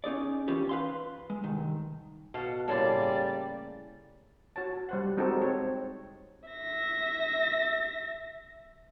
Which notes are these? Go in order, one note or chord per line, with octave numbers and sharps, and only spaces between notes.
C#4 D#4 G#4 D5
E3 C#4 F4 G4 D5
B4 F5 C6
G#3
C2 G2 D#3
B2 A4 F5 F#5
A2 C#3 G3 A#3 A4 D5 G#5 C6
F#4 C#5 A5
G3 C5 F#5
G#3 C4 D#4 F#4 G4 A4
C4 C#5
E5 A#6